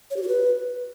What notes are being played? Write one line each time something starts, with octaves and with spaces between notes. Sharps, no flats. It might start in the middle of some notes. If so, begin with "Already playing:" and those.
C#5
G4
F#4
B4